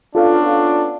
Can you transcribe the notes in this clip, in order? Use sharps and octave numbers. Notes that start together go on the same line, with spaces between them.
B3 C#4 D4 F4 A4 F5